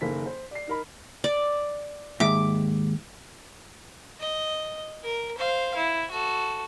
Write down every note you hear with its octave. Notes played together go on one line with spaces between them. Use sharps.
F#1 D#3 A#3 A4 C5 B6
C5
D5 C7
D#4 A#4 B5
D5
D#2 G#2 E5 D6
D#5
A#4
C5 F5
E4
F#4 A4